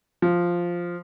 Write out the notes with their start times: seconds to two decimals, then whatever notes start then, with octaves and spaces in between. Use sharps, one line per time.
0.22 F3